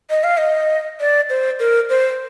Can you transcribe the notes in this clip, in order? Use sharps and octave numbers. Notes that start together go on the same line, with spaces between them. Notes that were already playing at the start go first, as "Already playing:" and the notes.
D#5
F5
D#5
D5
C5
A#4
C5